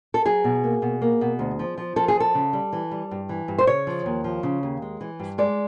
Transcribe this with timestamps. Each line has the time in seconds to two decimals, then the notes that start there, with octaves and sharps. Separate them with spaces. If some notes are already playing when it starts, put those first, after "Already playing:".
0.14 A4
0.25 F#3 G#4
0.44 B2
0.64 A#3
0.82 B2
1.02 A#3
1.21 B2
1.39 D2
1.59 F3
1.78 F3
1.96 F3 A4
2.08 G#4
2.16 F3 A4
2.35 C#3
2.53 G3
2.73 E3
2.91 G3
3.11 G2
3.29 E3
3.48 G2
3.58 C5
3.67 C#3 C#5
3.87 F3
4.06 D#2
4.24 F3
4.43 C#3
4.63 D#2
4.82 G#3
5.01 E3
5.19 G2
5.38 G#3 D5